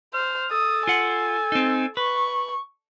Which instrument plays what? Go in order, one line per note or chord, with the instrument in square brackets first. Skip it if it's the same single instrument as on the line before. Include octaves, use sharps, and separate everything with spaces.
[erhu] C5 [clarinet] F6
[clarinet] A4 [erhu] D#6
[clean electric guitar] F4 F#5 [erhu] G#5
[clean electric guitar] C4 D#4
[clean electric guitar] B4 [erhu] C#6